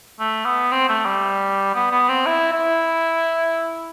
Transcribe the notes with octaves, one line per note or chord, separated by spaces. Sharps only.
A3
B3
C4
A3
G3
B3
B3
C4
E4
E4